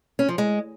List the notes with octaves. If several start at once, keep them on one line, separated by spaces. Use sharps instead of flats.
C#4
F3
G#3